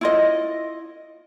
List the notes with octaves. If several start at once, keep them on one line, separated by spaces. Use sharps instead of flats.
E4 F4 D#5